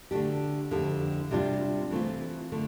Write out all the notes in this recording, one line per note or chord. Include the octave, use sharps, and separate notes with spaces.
D3 A3 D4 G4
F2 D3 A3 E4 G4
C3 G3 D4 F4
E3 A3 C4 F4
D3 A3